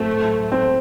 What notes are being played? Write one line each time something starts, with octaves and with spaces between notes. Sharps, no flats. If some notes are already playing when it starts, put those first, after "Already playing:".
Already playing: A2 F#3 A3 C4
C4